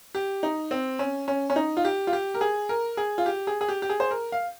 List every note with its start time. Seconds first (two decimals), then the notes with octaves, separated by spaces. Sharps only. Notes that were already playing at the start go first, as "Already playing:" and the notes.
0.15 G4
0.43 D#4
0.71 C4
0.99 C#4
1.28 C#4
1.50 C#4
1.56 D#4
1.77 F4
1.85 G4
2.07 F4
2.13 G4
2.34 A#4
2.41 G#4
2.69 A#4
2.97 G#4
3.18 F4
3.26 G4
3.47 G#4
3.61 G#4
3.68 G4
3.82 G4
3.89 G#4
4.00 C5
4.11 A#4
4.32 F5